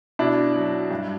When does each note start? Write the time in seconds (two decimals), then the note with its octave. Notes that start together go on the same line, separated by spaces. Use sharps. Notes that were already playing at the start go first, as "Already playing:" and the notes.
0.19 B2 D4 E4
0.55 F#3
0.91 G2